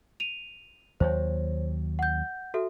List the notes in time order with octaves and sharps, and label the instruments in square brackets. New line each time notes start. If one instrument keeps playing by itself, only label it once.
[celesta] D#7 F7
[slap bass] D#2 F#3 [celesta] C5 C#5
[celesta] F#5 G6
F#4 A4 E5